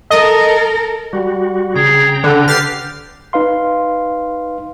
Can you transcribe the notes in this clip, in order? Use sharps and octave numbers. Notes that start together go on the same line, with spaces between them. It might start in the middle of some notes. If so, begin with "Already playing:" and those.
A4 A#4 D#5
G3 F#4
C#3 G#4 G5 A#5
D3 F#5
G4 B4 F6 A6 C7
D#4 B4 F5 C6